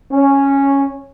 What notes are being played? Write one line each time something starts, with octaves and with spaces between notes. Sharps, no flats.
C#4